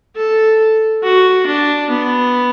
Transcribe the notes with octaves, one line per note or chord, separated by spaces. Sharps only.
A4
F#4
D4
B3